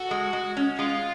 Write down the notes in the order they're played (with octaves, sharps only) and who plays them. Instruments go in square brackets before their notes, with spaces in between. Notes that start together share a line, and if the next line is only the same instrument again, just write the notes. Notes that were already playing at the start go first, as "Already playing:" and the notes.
Already playing: [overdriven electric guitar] F#4 [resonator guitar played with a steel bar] A4
[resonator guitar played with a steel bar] G#3
G#3
C#4
[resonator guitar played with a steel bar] G#3 [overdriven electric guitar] F4